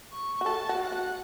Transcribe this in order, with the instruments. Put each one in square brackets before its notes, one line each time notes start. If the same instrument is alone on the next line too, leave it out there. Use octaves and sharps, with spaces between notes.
[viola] C#6
[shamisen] F#4
[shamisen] A4 [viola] A5
[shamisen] F#4
[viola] F#5
[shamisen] F#4